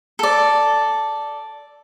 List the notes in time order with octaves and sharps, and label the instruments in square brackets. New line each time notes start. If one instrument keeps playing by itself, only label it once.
[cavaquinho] A4 D5